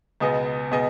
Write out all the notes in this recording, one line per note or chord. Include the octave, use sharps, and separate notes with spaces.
C#2 B2 B3 G#4 D#5
B2 B3 G#4 D#5